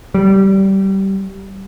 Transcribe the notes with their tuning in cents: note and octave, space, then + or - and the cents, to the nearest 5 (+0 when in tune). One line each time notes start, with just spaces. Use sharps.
G3 -20